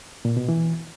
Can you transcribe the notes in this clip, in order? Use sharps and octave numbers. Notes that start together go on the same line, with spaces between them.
A#2
B2
E3